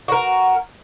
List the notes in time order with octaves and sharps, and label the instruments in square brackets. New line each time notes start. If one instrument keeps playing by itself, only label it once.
[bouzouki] F#4 A#4